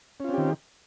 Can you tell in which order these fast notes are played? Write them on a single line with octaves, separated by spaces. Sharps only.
C#4 F4 C4 G4 D#3